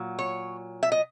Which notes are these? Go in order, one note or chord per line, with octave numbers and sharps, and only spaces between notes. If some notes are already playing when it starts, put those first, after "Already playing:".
Already playing: A#2 F#3
C#5
E5
D#5